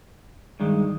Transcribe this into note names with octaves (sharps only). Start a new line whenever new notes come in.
G2 D#3 G#3